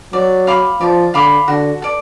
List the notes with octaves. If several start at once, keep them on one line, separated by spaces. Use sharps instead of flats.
F#3 D5
F5 B5 D6
F3 D5
D3 F5 B5 D6
D3 F#4
A4 D5